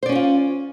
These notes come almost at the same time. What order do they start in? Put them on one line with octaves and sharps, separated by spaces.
C5 D5 C#4 F#4 F4